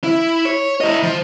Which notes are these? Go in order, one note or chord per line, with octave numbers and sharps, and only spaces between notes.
E4
C#5
E4 D#5
F3